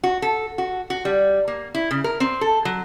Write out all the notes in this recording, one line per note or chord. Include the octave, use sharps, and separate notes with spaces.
F#4
A4
F#4
F#4
G3
A#3
E4
C#3
A#4
C4
A4
F#3